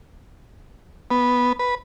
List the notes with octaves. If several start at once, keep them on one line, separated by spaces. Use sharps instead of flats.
B3
B4